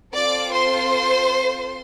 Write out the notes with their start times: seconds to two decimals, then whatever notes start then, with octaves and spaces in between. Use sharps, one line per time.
0.15 C4 F4 A4 D5 D6
0.54 C5 C6